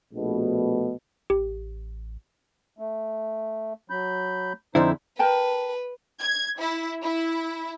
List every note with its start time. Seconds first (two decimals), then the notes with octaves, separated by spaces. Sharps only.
0.13 A#1 B2 A3
1.30 A1 G4
2.79 A3
3.90 F#3 B5 G6
4.75 F2 D3 D#4 E4 C5
5.19 A#4 B4 G5 A5
6.22 G#6
6.59 E4
7.02 E4